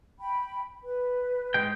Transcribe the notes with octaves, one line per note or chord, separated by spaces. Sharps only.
G5 B5
B4
G#2 G#3 G5